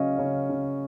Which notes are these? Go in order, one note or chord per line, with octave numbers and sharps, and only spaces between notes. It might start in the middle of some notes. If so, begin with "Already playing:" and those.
Already playing: C#3 F#3 C#4 D#5 F5
C#3 C#5
C#3